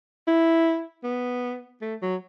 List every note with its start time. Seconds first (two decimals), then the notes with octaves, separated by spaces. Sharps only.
0.27 E4
1.04 B3
1.81 A3
2.02 F#3